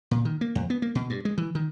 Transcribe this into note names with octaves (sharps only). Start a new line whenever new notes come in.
A#2
D#3
A#3
F2
B3
A#3
B2
G2
G#3
E3
D#3